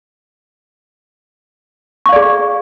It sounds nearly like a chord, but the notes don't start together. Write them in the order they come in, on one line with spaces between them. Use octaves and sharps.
C#6 F5 D5 G#4